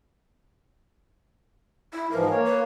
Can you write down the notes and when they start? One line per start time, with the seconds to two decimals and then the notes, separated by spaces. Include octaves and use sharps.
1.93 E4
2.11 G#2 E3 F3 A#4
2.30 A#3 C#5
2.46 B4